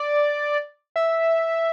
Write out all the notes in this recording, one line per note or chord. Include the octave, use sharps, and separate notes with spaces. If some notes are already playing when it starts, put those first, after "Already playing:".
Already playing: D5
E5